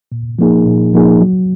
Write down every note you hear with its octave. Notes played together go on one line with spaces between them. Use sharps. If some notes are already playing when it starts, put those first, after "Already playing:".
A#2
F3 A#3 D#4 G#4
A#2
F3 A#3 D#4 G#4
F#3